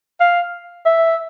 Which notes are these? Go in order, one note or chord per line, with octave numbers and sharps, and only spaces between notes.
F5
E5